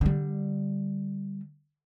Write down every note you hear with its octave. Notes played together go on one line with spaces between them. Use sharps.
D3 G3